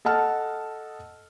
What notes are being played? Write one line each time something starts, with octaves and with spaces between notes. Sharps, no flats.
A4 D#5 F#5 A5 F6